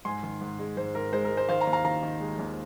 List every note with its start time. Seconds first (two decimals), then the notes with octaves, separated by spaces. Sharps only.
0.05 G#2 G#5 C6
0.23 D#3
0.41 G#2
0.59 G#3
0.77 G#2 C5
0.95 G#2 A#4
1.12 G#3 C5
1.24 A#4
1.30 G#3
1.37 C5
1.49 D#3 C5 F5
1.61 F5 A#5
1.67 D#2
1.73 F5 A#5
1.84 D#3 F5 A#5
2.03 D#3
2.20 G#3
2.39 D#2